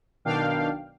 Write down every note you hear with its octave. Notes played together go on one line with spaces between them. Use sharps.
B1 B2 D#3 D4 F5 G5